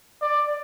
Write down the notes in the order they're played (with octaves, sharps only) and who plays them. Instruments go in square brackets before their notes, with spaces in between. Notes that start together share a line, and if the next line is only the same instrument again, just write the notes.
[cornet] D5